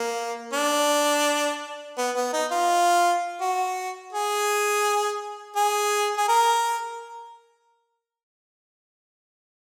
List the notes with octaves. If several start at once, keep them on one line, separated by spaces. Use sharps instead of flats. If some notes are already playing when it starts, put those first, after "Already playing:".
Already playing: A#3
D4
B3
B3
D#4
F4
F#4
G#4
G#4
G#4
A#4